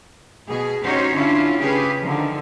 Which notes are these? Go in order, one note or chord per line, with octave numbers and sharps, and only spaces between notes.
B2 G#4
C#4 D#4 F#4 G4 C5 C#5
D3 C#4 D4 E4 F4
C#3 C#4 G4 G#4 B4
D3 D#3 F3